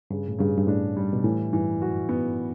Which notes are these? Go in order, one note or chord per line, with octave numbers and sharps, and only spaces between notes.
G2 C#3
A2
G2 C#3
G2
A2 D4
G3
B2
A2 E3
G2 E3
F#2 F#4
B3